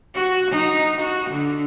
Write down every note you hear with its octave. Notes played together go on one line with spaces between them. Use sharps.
F#4
D#4
F#4
D3